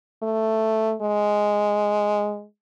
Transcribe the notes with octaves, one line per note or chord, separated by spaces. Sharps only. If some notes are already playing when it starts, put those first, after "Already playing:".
A3
G#3